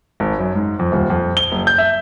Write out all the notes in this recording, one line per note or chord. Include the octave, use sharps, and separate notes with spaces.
G#1
F#2
G#2
F2
D#1
F2
G7
F#1
G6
E5